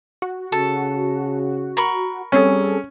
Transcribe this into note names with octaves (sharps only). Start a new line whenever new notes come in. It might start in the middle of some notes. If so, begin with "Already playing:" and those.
F#4
C#3 A4
A#4 B5 C#6
G3 C4 C#4 G#4 A4